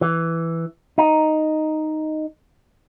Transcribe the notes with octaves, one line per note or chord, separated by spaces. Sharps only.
E3
D#4